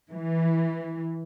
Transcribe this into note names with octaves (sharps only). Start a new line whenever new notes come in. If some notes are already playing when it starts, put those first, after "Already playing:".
E3